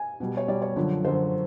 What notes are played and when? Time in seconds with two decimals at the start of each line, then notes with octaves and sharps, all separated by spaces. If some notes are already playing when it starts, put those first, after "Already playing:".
Already playing: G#5
0.20 B2 G3
0.37 C#5
0.48 B2 G3 D5
0.62 C#5
0.76 F#2 D3 F3
1.04 F#2 D3 F3 C5